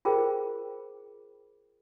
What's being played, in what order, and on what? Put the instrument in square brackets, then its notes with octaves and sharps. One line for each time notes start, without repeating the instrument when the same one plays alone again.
[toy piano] F4 G#4 A#4 C5 G5